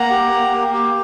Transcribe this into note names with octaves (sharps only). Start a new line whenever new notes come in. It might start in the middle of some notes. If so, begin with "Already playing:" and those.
Already playing: A#3 F#5 A#5
G4
A#3
A#3
G4